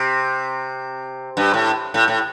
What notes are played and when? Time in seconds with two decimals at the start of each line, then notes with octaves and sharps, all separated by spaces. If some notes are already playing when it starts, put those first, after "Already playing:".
Already playing: C3
1.37 G2
1.54 A2
1.94 A2
2.08 A2